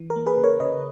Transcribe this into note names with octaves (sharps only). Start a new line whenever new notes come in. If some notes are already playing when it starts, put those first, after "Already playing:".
Already playing: E3
A#4
A#3
G#4 B4
C#3
A#4 C#5
C#3 B4 D#5